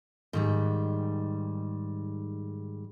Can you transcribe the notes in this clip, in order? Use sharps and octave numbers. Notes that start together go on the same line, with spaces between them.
G#2 D#3 G3